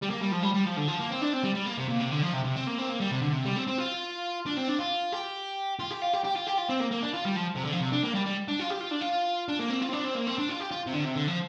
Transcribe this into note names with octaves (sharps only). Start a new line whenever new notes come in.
G3
A#3
G3
F3
G3
G3
F3
D3
F3
A#3
C4
D4
C4
G3
G3
A#3
C3
A#2
C3
D3
F3
C3
C3
C4
A#3
C4
A#3
G3
C3
D3
C3
G3
C4
C4
F4
D4
C4
D4
F4
G4
F4
G4
F4
G4
G4
F4
G4
F4
C4
A#3
A#3
D4
F4
G3
F3
C3
D3
F3
C3
D4
A#3
G3
G3
D4
F4
G4
F4
D4
F4
D4
A#3
C4
F4
C4
D4
C4
A#3
C4
D4
F4
G4
F4
C3
D3
C3
D3
F3